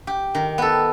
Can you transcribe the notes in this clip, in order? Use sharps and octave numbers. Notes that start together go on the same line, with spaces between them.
G4
D#3
B3 A4